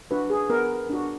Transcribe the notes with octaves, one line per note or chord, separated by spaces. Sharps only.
D4 F#4 B4
G#4
B3 A#4
D4 F#4